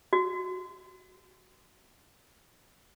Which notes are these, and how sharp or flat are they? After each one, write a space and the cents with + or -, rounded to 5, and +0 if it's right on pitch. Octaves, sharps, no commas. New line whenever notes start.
F#4 -5